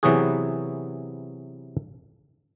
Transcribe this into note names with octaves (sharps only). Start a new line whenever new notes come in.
C3 E3 F#3 B3 F#4 G#4